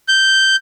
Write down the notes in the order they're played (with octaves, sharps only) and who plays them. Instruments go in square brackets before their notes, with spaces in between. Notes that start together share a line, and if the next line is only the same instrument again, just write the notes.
[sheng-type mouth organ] G6